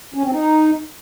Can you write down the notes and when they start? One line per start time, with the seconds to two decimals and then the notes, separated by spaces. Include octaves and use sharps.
0.14 C#4
0.23 C4
0.33 D#4